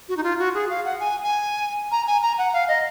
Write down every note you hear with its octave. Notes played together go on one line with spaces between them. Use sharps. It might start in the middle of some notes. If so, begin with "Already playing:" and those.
F#4
D#4
F4
F#4
G#4
F5
F#5
G#5
G#5
A#5
G#5
A#5
F#5
F5
D#5